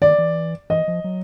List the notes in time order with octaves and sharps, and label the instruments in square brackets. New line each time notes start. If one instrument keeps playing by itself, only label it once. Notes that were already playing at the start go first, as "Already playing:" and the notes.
[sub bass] D#3 [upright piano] D5
[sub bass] E3
[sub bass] E3 [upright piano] D#5
[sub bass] F3
F#3